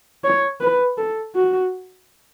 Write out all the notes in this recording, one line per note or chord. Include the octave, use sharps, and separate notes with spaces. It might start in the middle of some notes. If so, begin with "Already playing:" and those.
C#5
B4
A4
F#4